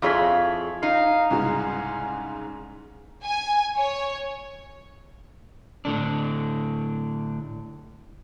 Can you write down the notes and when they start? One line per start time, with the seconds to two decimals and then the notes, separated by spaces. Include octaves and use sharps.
0.02 F2 E4 F4 G#4 C#5 B6
0.83 D#4 F5
1.30 C2 G#2 C#3 C#4
3.24 G#5
3.78 C#5
5.85 A2 D3 D4